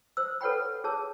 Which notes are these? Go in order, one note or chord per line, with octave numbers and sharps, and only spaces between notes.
C5 E6
A4 B4 C#5 F#5 G5 B5
G#4 C#5 A5 E6